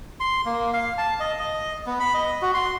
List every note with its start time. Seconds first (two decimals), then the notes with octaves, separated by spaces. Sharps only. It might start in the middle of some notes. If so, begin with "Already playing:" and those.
0.20 C6
0.46 A#3
0.73 F5
0.98 A5
1.20 D#5
1.39 D#5
1.86 B3
2.00 B5
2.14 D#5
2.42 F#4
2.54 C6